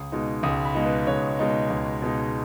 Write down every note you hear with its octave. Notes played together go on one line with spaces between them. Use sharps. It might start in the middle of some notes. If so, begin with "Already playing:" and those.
Already playing: C#2 D#6
B2 G#3 D#4
C#2 D#6
B5
B2 G#3 D#4
B4
C#2 C#5
B2 G#3 D#4
C#2
B2 G#3 D#4